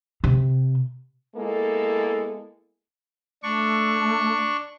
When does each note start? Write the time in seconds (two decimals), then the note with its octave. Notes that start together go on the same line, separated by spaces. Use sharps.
0.24 C3
1.35 G#3 A#3 B3 E4 A4
3.43 A3 D4 C#6